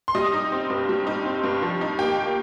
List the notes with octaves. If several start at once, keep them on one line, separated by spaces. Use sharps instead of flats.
C6
G3 D#5 D#6
D#4
C4
G2
G3
D#4
C4
G2
F3
D#4
A#3 G4 G5